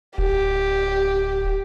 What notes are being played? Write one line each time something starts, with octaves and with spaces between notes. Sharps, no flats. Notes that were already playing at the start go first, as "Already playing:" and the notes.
D1 G4